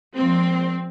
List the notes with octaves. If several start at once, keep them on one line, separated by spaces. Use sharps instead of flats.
A#2 F3 G#3 C4